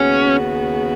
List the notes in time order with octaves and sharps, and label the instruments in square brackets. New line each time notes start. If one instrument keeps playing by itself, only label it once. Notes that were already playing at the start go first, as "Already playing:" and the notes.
Already playing: [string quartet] D#2 C#3 B3 F#4 [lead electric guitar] C#4